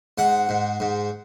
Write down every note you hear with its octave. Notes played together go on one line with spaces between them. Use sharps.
G#2 F#5
G#2
G#2